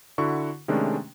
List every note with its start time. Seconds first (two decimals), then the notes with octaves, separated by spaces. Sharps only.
0.18 D3 E4 F#4 C#6
0.68 C3 D#3 G#3 A3 C#4 D4